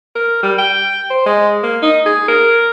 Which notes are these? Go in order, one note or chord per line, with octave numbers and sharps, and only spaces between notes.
A#4
G3
G5
C5
G#3
A#3
D#4
G#4
A#4